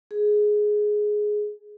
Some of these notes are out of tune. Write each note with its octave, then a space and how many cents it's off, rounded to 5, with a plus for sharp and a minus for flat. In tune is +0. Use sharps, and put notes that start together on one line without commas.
G#4 +10